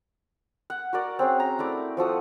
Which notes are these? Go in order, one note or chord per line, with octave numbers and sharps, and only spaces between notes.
F#5
F#4 A#4 D5
C4 C#4 G#4
A#5
A3 E4 D5
F3 F#4 A4 D#6